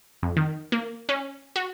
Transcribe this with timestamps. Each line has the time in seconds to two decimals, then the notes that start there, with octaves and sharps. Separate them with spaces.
0.23 F2
0.37 D#3
0.72 A#3
1.09 C#4
1.56 F#4